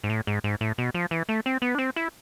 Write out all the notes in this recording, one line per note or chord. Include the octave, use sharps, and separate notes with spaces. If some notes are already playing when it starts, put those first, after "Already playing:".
G#2
A2
G#2
G#2
A2
B2
F3
E3
A3
C4
B3
D4
C4
E4